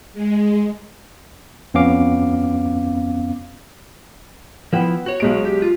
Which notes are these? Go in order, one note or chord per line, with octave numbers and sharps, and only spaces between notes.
G#3
F2 B3 C#4 F5 D6
F3 B3 E4 F#5 G5
F#4 C#5
B1 G#3 D7
G4
F4